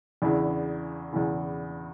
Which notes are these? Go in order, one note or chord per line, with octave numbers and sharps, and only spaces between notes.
E2 C#3 E3 D4 E4
E2 C#3 E3